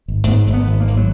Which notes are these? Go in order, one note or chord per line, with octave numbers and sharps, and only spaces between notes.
G#1
G#2 B3
G#1
B3
G#1
A#3
G#1
F#3